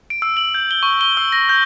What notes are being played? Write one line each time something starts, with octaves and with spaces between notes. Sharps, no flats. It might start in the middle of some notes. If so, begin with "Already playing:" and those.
D7
E6
F#7
G6
G7
C#6
G7
E6
A#6
G6